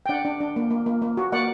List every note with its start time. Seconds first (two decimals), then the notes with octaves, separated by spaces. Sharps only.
0.06 G5
0.09 D4 D5 F#5
0.25 D4
0.40 D4
0.56 A#3
0.71 A#3
0.86 A#3
1.02 A#3
1.17 F#4
1.32 A#3 D5 F#5